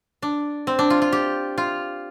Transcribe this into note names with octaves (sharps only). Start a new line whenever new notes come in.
D4
C4
D4
F4
F4
G4
F4